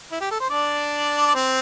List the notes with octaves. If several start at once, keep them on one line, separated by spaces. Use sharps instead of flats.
E4
G4
A4
C5
D4 D5
D5
C4 C5